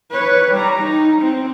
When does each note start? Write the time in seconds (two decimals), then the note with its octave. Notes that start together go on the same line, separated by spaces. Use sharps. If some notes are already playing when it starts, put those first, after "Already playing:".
0.11 B4 C#5
0.53 G3 A#5
0.83 D#4
1.22 C4